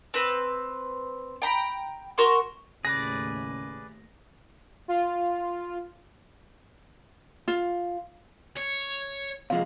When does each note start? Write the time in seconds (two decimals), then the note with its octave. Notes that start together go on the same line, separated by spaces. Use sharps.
0.14 C4 B4
1.42 G5 A#5 B5
2.18 F#4 A#4 C6 C#6
2.85 D#2 A2 C#3 G#4 B4 D5 A#6
4.88 F4
7.48 F4
8.57 C#5
9.50 C3 F3 G#3 F5